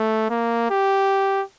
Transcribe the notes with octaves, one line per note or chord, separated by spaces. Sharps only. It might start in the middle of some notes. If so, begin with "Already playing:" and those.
Already playing: A3
A#3
G4